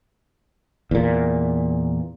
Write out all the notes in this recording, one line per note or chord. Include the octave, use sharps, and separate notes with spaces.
E2 A#2